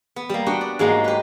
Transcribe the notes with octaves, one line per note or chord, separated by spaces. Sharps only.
B3
G3 A#3
B3 D4 F#4 G4 F#5 G5
D5
G#2 F#3 G#3 A#3 D#4
G4 B4